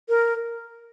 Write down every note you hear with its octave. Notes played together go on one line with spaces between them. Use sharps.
A#4